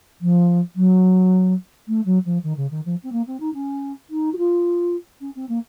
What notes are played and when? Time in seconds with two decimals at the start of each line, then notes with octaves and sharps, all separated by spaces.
0.21 F3
0.75 F#3
1.87 A3
2.05 F#3
2.25 F3
2.43 D#3
2.57 C#3
2.71 D#3
2.85 F3
3.03 C4
3.12 A#3
3.27 C4
3.40 D#4
3.54 C#4
4.10 D#4
4.33 F#4
4.38 F4
5.21 C#4
5.35 C4
5.49 A#3